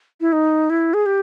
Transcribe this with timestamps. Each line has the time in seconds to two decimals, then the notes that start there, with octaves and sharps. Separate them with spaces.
0.21 E4
0.32 D#4
0.70 E4
0.94 G#4
1.06 G4